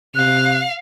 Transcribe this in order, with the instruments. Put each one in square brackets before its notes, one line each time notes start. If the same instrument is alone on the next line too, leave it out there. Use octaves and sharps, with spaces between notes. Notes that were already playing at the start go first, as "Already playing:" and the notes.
[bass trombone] C3 [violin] F5 [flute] F#6